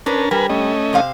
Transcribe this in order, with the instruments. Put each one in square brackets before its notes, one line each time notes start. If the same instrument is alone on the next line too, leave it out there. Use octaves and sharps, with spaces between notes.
[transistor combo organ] C#4 A#4 A5 [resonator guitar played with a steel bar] D4 B4
[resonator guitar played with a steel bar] G3 [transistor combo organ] A#4 B4 G#5
[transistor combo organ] A3 C#4 D#5
[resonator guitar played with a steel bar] C3 C5 F5